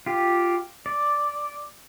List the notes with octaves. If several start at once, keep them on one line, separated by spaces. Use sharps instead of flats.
F4 G4
D5